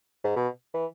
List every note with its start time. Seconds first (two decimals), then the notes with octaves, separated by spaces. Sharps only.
0.24 G#2
0.36 B2
0.74 E3